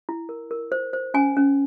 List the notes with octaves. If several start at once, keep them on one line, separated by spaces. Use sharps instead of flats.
E4
A#4
A#4
C5
C5
C#4 G#5
C#4